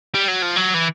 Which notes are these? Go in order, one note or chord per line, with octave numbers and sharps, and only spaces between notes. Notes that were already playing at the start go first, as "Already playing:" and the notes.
G3
F#3
F3
F#3
E3